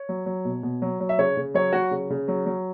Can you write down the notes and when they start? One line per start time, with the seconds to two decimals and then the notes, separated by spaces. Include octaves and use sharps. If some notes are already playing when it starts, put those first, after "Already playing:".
Already playing: C#5
0.09 F#3
0.26 F#3
0.45 B2
0.63 B2
0.82 F#3
1.00 F#3
1.09 E5
1.18 C#3 C#5
1.37 C#3
1.54 F#3 C#5
1.73 F#3 F#4
1.91 C#3
2.10 C#3
2.28 F#3
2.46 F#3